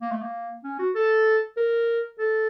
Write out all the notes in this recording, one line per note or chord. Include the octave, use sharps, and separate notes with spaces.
A#3
A3
A#3
C#4
F#4
A4
A#4
A4